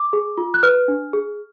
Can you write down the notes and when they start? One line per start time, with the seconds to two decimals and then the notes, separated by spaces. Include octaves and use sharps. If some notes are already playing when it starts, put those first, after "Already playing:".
Already playing: D6
0.13 G#4
0.38 F4
0.54 F#6
0.63 B4 F6
0.88 D4
1.13 G#4